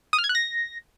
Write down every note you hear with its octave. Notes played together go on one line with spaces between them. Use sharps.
D#6
F6
G#6
F#6
A#6